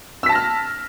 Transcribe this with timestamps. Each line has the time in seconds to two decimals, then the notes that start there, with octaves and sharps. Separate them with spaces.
0.23 E6
0.26 B6
0.29 A5
0.32 A#6
0.35 F6